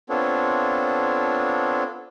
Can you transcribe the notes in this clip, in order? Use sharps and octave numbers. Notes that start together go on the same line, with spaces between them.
B3 C4 D4 F4 A4 C#5